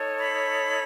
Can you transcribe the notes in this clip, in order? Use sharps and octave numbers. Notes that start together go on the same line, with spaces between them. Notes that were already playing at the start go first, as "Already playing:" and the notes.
Already playing: D#4 A4 C#5
B5